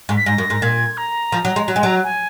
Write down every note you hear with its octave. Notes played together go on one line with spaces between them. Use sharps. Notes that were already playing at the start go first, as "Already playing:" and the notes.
G#2
B6
G#2 A#6
F#2
G#2
A#2 G#6
A#5
F3
F#3
G#3
F#3
G#3 G#5
F#3 A#5
G#5